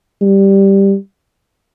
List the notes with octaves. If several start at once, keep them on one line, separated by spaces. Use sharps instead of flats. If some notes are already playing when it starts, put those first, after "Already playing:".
G3